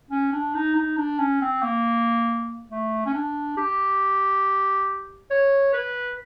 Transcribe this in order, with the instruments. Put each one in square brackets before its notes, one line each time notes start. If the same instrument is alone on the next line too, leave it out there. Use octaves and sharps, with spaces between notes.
[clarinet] C#4
D4
D#4
D#4
D4
C#4
C4
A#3
A3
C#4
D4
G4
C#5
B4